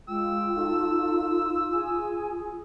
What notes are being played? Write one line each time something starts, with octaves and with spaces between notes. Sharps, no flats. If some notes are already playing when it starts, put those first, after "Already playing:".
G#3 F4 G5 E6
D#4 A4
G#4 G#5